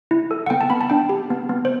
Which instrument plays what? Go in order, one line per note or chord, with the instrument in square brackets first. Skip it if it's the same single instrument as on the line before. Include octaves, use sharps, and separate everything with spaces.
[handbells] E4
A4
F#5
B3 G5
A5
B3 B5
A5
D4 G5
G4
B3
B3
C5